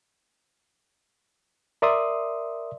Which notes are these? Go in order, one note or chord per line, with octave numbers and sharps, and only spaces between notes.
A#4 D5 E5 C6 D#6